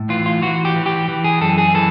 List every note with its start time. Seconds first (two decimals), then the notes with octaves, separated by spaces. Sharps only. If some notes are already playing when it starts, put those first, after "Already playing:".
Already playing: A2
0.09 E3 F4
0.26 F4
0.42 E3 F#4
0.65 G4
0.76 E3
0.86 G4
1.08 E3
1.24 G#4
1.41 F#2 A4
1.58 G#4
1.74 E3 A4